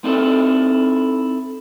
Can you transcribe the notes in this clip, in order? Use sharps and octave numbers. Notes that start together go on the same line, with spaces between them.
C4 D#4 E4 A4 C5